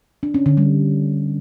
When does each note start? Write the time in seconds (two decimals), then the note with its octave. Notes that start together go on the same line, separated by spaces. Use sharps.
0.23 D4
0.34 C#4
0.46 D3
0.57 G3